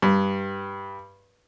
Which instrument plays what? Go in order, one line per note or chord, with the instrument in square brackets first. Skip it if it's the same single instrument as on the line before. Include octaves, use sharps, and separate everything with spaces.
[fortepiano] G2